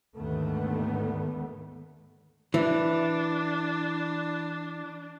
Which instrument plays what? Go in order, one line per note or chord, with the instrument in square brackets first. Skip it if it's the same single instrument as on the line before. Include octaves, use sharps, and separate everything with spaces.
[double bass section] D#2 G#2 D3 D#3 A3 B3
[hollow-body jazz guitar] E3 [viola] D4